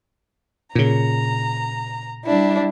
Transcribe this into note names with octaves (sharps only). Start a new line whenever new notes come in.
A#2 C#3 A#5
G3 D4 E4